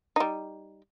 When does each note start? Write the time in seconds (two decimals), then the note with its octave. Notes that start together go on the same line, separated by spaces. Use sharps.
0.16 G3 D#4